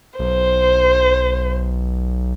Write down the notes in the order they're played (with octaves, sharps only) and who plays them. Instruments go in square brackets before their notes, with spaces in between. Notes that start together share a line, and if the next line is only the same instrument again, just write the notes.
[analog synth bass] B1 [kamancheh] C5